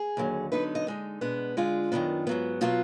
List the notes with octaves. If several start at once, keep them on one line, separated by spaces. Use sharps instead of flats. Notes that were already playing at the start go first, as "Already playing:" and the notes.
Already playing: G#4
D#2 D3 F#3
D3 F#3 B3 D#4 B4
D#5
D3 G#3 D#4
B2 G#3 B3 D4
D3 G#3 D4 F4
F#2 D#3 F#3 B3 D4
G#2 F#3 B3
B2 F#3 B3 F4